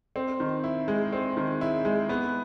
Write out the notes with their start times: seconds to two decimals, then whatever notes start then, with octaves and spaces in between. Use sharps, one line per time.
0.16 C4
0.40 D#3
0.64 E4
0.88 G#3
1.13 C4
1.37 D#3
1.61 E4
1.85 G#3
2.09 B3